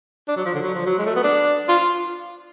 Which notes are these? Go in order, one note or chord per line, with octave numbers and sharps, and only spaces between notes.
D4
F#3
F3
D3
F#3
F3
F#3
G#3
A3
B3
D4
F4